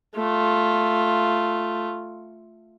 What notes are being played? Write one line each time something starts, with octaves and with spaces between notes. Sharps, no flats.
A3 F4